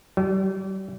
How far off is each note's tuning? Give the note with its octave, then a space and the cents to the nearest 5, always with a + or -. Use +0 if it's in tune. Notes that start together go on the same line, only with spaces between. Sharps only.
G3 -40